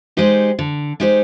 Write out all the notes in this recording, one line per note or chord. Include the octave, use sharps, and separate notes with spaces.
G#3 D#4 G4 C5
D3
G#3 D#4 G4 C5